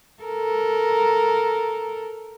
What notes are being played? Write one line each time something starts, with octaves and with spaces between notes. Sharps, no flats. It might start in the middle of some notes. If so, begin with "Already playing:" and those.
A4 A#4